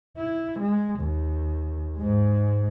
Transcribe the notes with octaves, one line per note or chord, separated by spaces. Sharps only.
E4
G#3
D#2
G#2 G#3